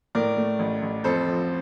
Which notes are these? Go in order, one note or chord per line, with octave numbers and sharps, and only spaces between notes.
A2 A#4 D5
A3
A1
A1
F2 A4 C5
F3